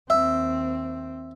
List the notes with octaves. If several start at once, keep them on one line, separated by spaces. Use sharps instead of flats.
D#2 C4 E5